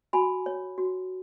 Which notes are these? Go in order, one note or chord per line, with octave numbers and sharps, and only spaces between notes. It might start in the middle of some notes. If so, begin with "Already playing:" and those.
F#4 G#5 B5
C#5
F#4